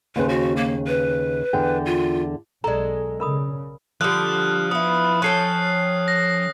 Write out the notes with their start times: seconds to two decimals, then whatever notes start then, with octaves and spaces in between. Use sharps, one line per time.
0.16 D#2 C#3 B4 C5
0.29 F#4
0.57 A#3
0.87 B4
1.53 E2 D3 G5
1.86 F4
2.64 B1 G#3 A4 D5 A#5
3.20 C#3 A#4 B5 D#6
4.01 D3 F3 G3 D#6 F6 F#6
4.71 B3 E4 D#6
5.22 C#4 A4 G5 F#6 C7
6.08 A#6